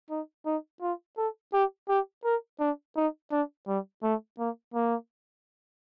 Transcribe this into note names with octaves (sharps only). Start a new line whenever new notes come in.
D#4
D#4
F4
A4
G4
G4
A#4
D4
D#4
D4
G3
A3
A#3
A#3